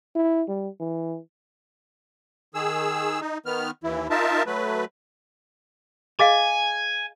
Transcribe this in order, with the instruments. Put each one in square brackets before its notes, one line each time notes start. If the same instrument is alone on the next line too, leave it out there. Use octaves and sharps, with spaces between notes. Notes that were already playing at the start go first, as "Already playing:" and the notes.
[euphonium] E4
G3
E3
[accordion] D#3 G#4 E6
D#4
D#3 B3 F6
D#2 E3 E4
D#4 F4 A#4 E5 A5
F#3 A3 B4
[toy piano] G#4 D#5 F5 [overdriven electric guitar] G#5